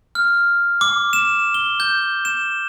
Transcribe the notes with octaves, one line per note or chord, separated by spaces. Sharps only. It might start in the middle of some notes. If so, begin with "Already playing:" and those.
F6
D6
E7
G7
G6
E7